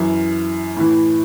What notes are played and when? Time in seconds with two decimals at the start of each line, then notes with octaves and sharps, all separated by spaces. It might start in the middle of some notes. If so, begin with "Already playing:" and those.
Already playing: F#2 E3
0.76 A2 E3